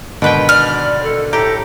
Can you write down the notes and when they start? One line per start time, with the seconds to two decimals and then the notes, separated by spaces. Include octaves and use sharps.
0.22 G#2 B2 D3 D#3 B4 G5
0.49 D5 F6
1.03 A4
1.33 A2 G4 A4 A#5